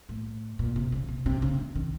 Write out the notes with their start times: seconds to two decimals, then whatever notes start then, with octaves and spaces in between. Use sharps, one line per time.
0.09 A2
0.59 A#2
0.76 C3
0.92 C#3
1.08 C3
1.26 C3
1.42 C#3
1.58 D3
1.75 D#3